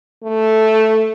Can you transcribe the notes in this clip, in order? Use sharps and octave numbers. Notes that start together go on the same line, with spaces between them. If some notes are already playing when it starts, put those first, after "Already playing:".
A3